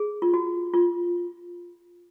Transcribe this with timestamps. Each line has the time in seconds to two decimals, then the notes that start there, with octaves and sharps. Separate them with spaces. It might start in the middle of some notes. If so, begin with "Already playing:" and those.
Already playing: G#4
0.22 F4
0.34 F#4
0.74 F4